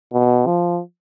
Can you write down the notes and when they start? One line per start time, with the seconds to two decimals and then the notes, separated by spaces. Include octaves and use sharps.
0.13 B2
0.46 F3